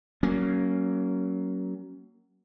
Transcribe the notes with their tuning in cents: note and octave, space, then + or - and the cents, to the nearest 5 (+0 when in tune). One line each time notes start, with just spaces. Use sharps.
F#3 +20 A#3 +0 C#4 +0